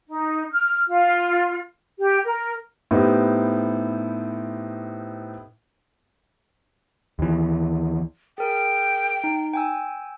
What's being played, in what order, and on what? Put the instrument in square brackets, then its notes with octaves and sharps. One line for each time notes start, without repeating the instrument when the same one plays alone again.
[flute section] D#4
F6
F4
G4
A#4
[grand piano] A2 B3 C4 D#4 G4
[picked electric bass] D#2 E3
[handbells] G#4 A#4 [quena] G5
[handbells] D#4
G5 G#5 E6